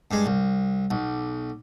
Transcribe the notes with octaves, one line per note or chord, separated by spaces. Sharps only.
G2 G#3
C2
B1